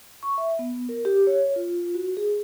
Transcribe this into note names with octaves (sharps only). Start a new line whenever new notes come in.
C#6
E5
B3
A#4
G4
C#5
F4
F#4
G#4